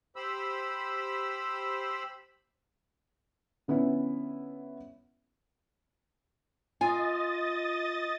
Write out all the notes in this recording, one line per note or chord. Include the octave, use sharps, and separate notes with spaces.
G4 C5 B5 E6
D3 B3 C#4 E4
F4 D#5 G#5 D#6 A6